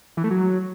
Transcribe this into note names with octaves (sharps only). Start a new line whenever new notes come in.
E3
A3
F#3